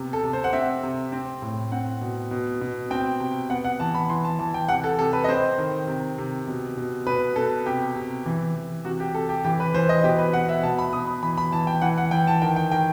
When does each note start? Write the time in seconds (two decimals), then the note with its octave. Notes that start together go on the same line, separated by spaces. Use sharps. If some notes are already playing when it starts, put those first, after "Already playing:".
Already playing: C3 B3
0.13 A4
0.23 C3
0.33 C5
0.44 F#5
0.53 C4 E5
0.83 C3
1.12 C4
1.42 A2
1.72 C4 F#5
2.01 B2
2.31 B2
2.61 B2
2.90 C4 G5
3.20 C3
3.50 B3 F#5
3.64 F#5
3.80 E3 A5
3.95 B5
4.10 E3 C6
4.24 A5
4.39 E3 A5
4.54 G5
4.69 C3 F#5
4.84 A4
4.99 C3 A4
5.13 B4
5.24 D#5
5.28 C4 C5
5.58 D#3
5.87 C3
6.18 C3
6.47 B2
6.77 B2
7.06 B2 B4
7.36 B2 A4
7.66 C3 G4
7.96 C3
8.26 E3
8.55 E3
8.85 C3 F#4
9.00 G4
9.14 C3 A4
9.29 G4
9.45 E3 G4
9.60 B4
9.74 E3 C5
9.89 D#5
10.04 B2 G4
10.18 B4
10.33 B2 F#5
10.49 E5
10.63 B2 A5
10.78 B5
10.93 B2 D#6
11.07 B5
11.23 E3 B5
11.38 B5
11.52 E3 A5
11.67 G5
11.82 E3 F#5
11.98 F#5
12.11 E3 G5
12.27 A5
12.42 D#3 G5
12.56 G5
12.71 D#3 G5